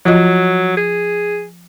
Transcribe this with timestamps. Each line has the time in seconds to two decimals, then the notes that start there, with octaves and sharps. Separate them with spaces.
0.05 F3 F#3 F4 D#5
0.77 G#4